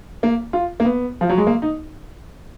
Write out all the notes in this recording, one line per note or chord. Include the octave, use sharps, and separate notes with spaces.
A#3
F4
A#3
B3
F3
F#3
G#3
A#3
D#4